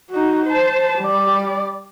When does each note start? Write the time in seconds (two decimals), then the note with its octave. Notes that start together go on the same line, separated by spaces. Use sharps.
0.10 D#4 F#4
0.46 C5 A5
0.98 G3 D5